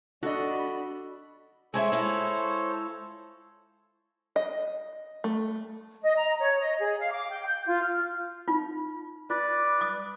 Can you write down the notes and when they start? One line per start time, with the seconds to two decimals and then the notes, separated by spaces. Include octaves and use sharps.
0.23 D4 F#4 A4 D#5 B5
1.74 G#3 G#4 A4 C5 C#5 E5
1.92 G#3 E4 F5
4.36 D#5
5.24 A3
6.02 D#5
6.16 A#5
6.40 C#5
6.61 D#5
6.79 G#4
6.99 F5
7.12 D6
7.30 G5
7.46 G6
7.66 F4
7.83 F6
8.48 D#4 F4
9.30 F4 B4 D5
9.81 D6 D#6